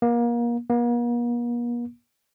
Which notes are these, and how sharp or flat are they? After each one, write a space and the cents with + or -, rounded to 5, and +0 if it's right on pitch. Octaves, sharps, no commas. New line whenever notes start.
A#3 +30
A#3 +45